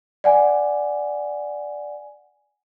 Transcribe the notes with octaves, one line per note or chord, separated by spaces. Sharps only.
D5 F#5 G#5